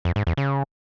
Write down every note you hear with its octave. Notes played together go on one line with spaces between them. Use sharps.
F2
G#2
E2
C#3